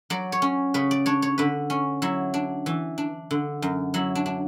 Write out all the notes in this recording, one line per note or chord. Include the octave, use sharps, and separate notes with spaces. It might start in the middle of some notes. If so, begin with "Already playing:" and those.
F#3 D5
C#5
C#4
C#3 B4
D5
D4 C#5
C#5
D3 B4
C#4
F#3 E4
D4
E3
D4
D3
F#2
F#3 E4
D4
D4